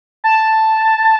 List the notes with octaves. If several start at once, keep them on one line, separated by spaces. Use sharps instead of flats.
A5